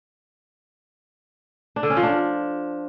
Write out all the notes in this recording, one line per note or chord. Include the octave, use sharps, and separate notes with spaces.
D4
D3
C#4
F3
D4